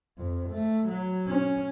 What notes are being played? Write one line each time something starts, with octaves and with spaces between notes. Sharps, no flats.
F2
A3
F#3
C#4